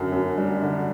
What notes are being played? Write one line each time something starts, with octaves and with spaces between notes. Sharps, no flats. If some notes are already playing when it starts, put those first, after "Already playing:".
Already playing: F#2 D3
F#2
G3
D3